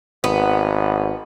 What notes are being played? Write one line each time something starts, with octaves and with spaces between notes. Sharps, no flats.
G#1 B3